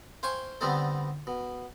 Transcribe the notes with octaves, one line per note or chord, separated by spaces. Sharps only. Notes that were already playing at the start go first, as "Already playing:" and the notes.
C5 F5 G5 G#5 C#6
D3 G3 B3 C4 D#4 A4
B2